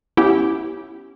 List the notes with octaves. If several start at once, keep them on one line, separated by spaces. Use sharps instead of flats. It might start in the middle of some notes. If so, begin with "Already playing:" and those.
B3 C#4 E4 G4